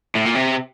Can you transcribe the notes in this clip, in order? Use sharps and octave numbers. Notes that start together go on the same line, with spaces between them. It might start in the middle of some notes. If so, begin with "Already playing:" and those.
A2
A#2
C3